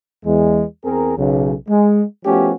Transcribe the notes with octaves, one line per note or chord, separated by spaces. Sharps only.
E2 E3 G#3
E2 C4 G#4 A#4
B1 C#3
G#3
F3 A3 B3 C#4 F#4 G4